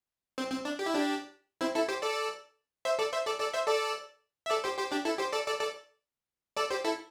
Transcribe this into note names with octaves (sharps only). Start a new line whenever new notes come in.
C4
C4
D4
G4
E4
D4 G4
C4 E4
E4 A4
G4 C5
A4 D5
C5 E5
A4 D5
C5 E5
A4 D5
A4 D5
C5 E5
A4 D5
E5
A4 D5
G4 C5
G4 C5
D4 G4
E4 A4
G4 C5
A4 D5
A4 D5
A4 D5
A4 D5
G4 C5
E4 A4